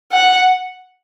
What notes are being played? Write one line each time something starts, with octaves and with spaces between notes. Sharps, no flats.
F#5